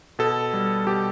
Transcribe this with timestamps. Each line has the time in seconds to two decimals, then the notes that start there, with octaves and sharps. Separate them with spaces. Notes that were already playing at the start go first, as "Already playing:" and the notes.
0.19 B2 A4
0.53 G3
0.86 B2 G4